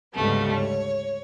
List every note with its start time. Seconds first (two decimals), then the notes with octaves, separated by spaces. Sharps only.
0.13 D2 G#2 C#3 G3 A3 B3
0.55 C#5